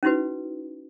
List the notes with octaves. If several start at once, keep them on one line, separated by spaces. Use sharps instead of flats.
C#4 D#4 E4 F#4 B4